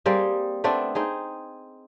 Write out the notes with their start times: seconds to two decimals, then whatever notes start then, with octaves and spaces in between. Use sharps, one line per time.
0.06 G3 A#3 C4 G#4
0.64 A3 B3 C4 D4
0.95 C4 D#4 G#4